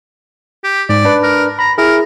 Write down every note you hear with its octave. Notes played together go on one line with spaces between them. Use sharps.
G4
G#2 D5
D4 B4
A#4
A#5 B5
E4 G#4 A#4